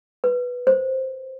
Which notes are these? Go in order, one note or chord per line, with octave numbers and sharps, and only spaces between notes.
B4
C5